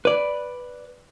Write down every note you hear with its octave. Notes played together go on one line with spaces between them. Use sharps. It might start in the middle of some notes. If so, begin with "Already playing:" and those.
B4 D5